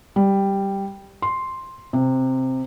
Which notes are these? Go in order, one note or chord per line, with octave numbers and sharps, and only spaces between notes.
G3
C6
C3